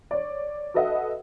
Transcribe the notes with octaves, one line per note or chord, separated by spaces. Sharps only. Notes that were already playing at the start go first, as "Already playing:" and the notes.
C#5 D5
F#4 A4 B4 D#5 E5 F#5